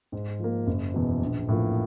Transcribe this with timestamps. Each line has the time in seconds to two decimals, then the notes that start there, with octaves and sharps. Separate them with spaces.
0.12 G#2
0.40 F3 A#3
0.67 F#1
0.94 E2 B2
1.21 A#1
1.49 A2 F3 A#3